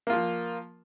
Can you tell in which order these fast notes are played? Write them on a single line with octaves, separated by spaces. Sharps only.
A#3 F4 F3